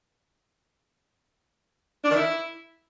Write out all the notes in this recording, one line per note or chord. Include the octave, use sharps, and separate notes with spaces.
D4
D#3
E4